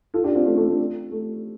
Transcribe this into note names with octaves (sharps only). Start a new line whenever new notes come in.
F4 A4
D4 G4
C4 F4
A3 D4
A3 D4
A3 D4
A3